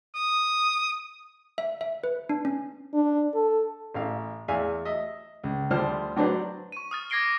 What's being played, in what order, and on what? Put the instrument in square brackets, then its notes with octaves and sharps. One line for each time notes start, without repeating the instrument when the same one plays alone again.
[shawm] D#6
[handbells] E5
E5
B4
D4
C#4
[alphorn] D4
A4
[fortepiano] A1 F5
E2 E5 F5 G#5
D#5 E5
C#2
D2 F3 G3 C5 A5 F6
F#3 D4 B4 C5 D5
[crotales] C#6 D#7
D#6 F6 A6
D6 G#6 A#6 C7 D7 G7